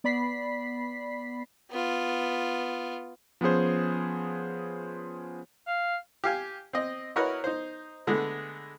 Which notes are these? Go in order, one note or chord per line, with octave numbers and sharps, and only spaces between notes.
B3 D5 B5 B6 C7
B3 F4
F3 B3 C#4 G#4 C5
F5
G4 F5 G#5
C4 D#5
E4 F#4 A#4 B4 C#5 D#5
D#4 C5
D3 G#3 A3 B3